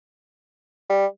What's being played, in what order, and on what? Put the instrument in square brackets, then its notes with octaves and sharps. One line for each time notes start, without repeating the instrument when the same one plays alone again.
[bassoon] G3